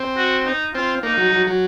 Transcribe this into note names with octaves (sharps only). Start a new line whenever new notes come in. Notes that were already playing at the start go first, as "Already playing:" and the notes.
Already playing: C4
F#4
D#4
C4 F4
A#3 D#4
F#3
F#3
F#3